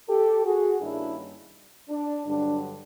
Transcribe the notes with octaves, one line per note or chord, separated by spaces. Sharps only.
G4 A4
F#4 G#4
G2 D#3 G3 A#3 C#4 D4 E4
D4
G2 D3 F#3 D4